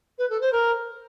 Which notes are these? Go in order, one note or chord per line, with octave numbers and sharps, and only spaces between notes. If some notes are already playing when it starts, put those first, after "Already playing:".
B4
A4
C5
A#4